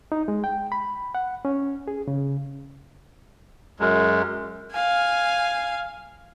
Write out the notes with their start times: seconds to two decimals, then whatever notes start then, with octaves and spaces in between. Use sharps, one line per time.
0.12 D#4
0.28 G#3
0.44 G5
0.72 B5
1.15 F#5
1.45 C#4
1.88 G#4
2.08 C#3
3.80 F#2 G#3
4.71 F5 G#5